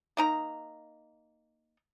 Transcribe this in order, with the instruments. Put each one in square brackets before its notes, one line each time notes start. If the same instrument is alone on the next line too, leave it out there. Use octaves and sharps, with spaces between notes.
[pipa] A#3 D#4 A#5